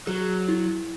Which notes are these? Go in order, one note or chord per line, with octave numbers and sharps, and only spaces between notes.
F#3 G#4
E4